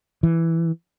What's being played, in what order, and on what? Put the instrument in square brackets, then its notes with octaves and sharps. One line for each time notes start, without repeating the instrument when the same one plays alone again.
[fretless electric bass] E3